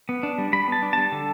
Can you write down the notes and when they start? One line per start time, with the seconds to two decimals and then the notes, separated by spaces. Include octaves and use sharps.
0.09 B3
0.23 D4
0.38 G3
0.53 G3 B5
0.68 B3 A5
0.82 D4
0.93 G3 A5
1.12 D3